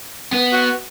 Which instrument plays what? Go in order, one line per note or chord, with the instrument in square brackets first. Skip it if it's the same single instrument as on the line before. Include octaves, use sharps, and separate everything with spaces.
[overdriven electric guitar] B3
[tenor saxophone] F#4